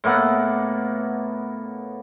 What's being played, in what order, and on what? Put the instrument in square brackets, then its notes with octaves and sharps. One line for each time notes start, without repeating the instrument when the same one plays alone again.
[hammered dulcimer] A2 A#3 B3 F#5